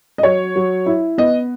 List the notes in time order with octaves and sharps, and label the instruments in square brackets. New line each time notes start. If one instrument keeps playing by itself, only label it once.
[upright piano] D#5
F#3 C#5
F#3
E4
B3 D#5